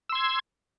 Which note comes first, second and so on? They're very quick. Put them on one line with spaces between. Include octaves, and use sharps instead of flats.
E6 C6 G#6